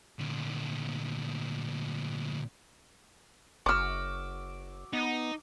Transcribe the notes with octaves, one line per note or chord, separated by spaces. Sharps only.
D2 A#2
F#1 F#4 D6 E6 F6
B3 D#4